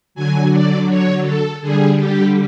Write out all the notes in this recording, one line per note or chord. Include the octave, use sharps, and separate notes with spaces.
D3 F#3 G#5
D5
C#5
A4
D3 G3 G#4
G4